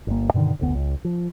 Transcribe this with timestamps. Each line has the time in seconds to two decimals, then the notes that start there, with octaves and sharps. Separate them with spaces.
0.07 G1 A#3
0.34 G2 B2 D3 D#3
0.59 F1 D2 B3
0.75 C#2
1.05 F3